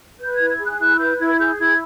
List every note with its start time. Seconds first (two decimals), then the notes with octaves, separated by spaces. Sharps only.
0.20 B4 G6
0.35 G#6
0.40 E4
0.50 G#6
0.60 G#4
0.65 F#6
0.80 E4 F#6
0.99 B4 G6
1.19 E4 G#6
1.39 G#4 G6
1.58 E4 G#6